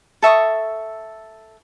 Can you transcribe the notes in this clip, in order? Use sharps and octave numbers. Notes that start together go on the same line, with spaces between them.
A4 E5 C#6 D#6